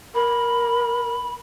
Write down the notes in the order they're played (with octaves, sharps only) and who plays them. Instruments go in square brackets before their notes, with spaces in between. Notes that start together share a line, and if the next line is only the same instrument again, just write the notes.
[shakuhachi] A#4 [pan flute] B5